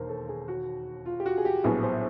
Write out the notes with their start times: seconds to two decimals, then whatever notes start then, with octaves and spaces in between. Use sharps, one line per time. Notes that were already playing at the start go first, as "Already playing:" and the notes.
Already playing: E1 D#2 A#4 C5
0.09 A4
0.28 G#4
0.48 F#4
1.06 F4
1.20 G4
1.26 F#4
1.38 G#4
1.45 G4
1.64 A#1 A2 F#3 B3 E4 G#4
1.83 C5